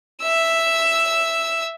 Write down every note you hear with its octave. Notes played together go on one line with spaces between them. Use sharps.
E5 E6